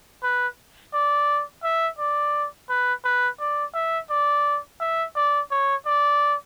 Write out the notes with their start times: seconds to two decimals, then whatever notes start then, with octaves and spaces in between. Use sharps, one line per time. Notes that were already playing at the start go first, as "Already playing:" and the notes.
0.23 B4
0.94 D5
1.63 E5
1.99 D5
2.69 B4
3.04 B4
3.40 D5
3.74 E5
4.10 D5
4.80 E5
5.16 D5
5.51 C#5
5.86 D5